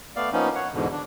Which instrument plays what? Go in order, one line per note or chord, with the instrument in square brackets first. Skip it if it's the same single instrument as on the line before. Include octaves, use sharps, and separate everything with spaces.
[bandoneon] A3 B3 D5 F5
F3 A#3 B3 C#4 D#4
C#5 F#5
E2 G#2 B2 D3
D4